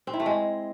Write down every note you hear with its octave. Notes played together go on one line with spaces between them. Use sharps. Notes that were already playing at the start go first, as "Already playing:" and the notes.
C4
E4
A3
G#3